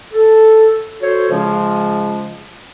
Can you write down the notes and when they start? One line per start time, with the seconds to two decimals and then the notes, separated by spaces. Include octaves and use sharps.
0.13 A4
1.01 F#4 A4 C5 C#5
1.30 C#3 F3 G#3 C#4 F4